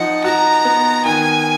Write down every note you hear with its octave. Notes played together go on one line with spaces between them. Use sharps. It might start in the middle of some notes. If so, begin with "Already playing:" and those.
Already playing: F3 D#4 F#5
F#4 A#5
B3
D#3 G#5